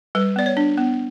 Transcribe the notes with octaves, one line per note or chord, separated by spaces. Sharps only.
G3 B4
B3 D5
C#5
D4
B3